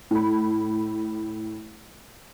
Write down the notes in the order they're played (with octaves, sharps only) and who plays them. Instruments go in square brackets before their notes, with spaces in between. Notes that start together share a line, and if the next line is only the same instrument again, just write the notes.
[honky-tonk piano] A2 B5